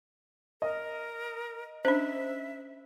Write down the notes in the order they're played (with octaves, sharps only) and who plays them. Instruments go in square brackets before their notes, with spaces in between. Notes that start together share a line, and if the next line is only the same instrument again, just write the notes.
[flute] A#4 [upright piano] D#5
[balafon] C#4 D4 [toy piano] C5 [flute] E5